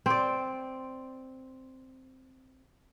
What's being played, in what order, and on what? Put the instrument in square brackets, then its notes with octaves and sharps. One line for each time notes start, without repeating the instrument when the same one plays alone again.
[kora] C4 D5